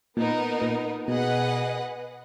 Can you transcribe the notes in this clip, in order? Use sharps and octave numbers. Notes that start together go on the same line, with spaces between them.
A#2 B3 D#4 A#4
A#2
B2 G#4 B4 D#5 F#5